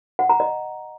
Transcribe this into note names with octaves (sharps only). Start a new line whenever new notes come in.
F#5
A#5
D#5